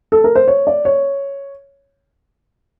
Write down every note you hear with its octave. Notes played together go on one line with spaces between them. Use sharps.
A4
A#4
C5
C#5
D5
C#5